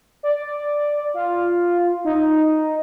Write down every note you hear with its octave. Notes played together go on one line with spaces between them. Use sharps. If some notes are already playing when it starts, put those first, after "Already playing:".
D5
F4
D#4